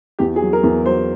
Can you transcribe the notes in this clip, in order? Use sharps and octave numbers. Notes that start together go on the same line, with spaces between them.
E2 G4
G#4
F#3
A#4
E2
F#3 C5